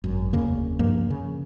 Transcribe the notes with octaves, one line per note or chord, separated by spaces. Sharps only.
G#1 F#2
F1 D#2 C#3 A#3
G2 F3 A#3
C#3